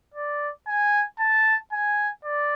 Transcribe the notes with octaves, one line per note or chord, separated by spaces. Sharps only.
D5
G#5
A5
G#5
D5